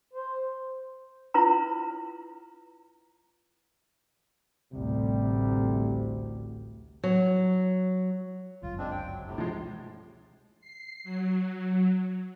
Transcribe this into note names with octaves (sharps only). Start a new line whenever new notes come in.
C5
E4 F4 B4 A#5
A1 D2 C3 G3
F#3
G1 C#2 F#2 F4
G#3 C4 D4
G5
F#3
A2 C3
B2 E3 F3 G#3
C7
F#3